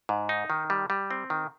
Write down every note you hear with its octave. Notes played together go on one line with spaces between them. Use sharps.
G#2
D#4
D#3
G3
G3
C4
D#3